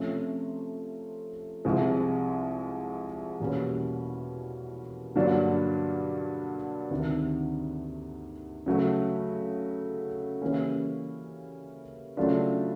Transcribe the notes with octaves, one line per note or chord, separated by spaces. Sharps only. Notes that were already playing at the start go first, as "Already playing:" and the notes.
Already playing: C3 F3 A3 C#4
C2 C3 F3 G#3
E2 B2 G3 A#3 C#4
G2 D3 F#3 A#3 D4
D2 C3 D#3
C#3 F#3 A3
C#3 E3 G3 A#3 C#4
C#3 F#3 A3 D4 F4